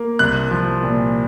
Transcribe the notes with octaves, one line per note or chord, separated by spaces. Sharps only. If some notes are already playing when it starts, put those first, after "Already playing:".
Already playing: A#3
C2 F#6
F3
A#2